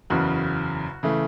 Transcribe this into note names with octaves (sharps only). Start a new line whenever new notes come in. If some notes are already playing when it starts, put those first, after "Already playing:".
F#1 E2 C#3 F#4
C#3 E3 A3